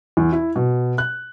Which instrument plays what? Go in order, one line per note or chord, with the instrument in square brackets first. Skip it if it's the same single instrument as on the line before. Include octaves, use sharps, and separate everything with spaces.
[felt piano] E2
E4
B2
F#6